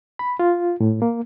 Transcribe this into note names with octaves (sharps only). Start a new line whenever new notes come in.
B5
F4
A2
A#3